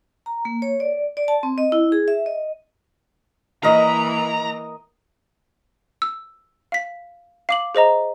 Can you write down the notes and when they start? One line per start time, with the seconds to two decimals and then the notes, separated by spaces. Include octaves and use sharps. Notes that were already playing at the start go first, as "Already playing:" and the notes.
0.26 A#5
0.45 A#3
0.62 C#5
0.80 D5
1.17 D5
1.28 A5
1.43 C4
1.58 D#5
1.72 E4
1.92 G#4
2.08 E5
2.26 D#5
3.63 E3 A#3 A#4 D#5 A#5
6.02 E6
6.72 F5 B6
7.49 F5 D6 F#7
7.75 G#4 C5 D#5 A#5